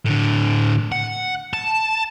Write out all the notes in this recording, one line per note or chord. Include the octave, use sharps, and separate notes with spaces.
A2 D3
F#5
A5